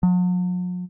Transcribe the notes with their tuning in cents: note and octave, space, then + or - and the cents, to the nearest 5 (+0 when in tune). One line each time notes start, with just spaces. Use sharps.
F#3 -45